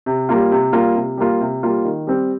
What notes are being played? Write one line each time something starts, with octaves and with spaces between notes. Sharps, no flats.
C3
G3 A#3 F4
C3
G3 A#3 F4
C3
G3 A#3 F4
C3
G3 A#3 F4
D#3
G3 C4